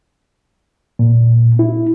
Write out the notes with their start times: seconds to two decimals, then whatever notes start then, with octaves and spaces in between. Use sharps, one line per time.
0.99 A#2
1.59 E4